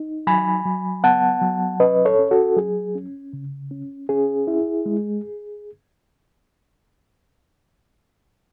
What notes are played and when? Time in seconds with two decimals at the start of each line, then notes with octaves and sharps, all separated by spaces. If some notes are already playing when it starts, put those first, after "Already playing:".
Already playing: D#4
0.27 F#3 G#5 B5
0.65 F#3
1.04 B3 F#5 A5
1.41 F#3
1.80 C#4 B4 D#5
2.05 A4 C#5
2.19 C#4
2.31 F#4 A4
2.56 F#3 G#4
2.95 C#4
3.33 C#3
3.71 C#4
4.09 C#4 G#4
4.47 E4
4.86 G#3